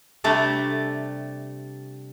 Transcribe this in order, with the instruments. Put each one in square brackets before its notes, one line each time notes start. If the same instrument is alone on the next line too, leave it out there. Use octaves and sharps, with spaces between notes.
[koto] C3 G3 A3 D4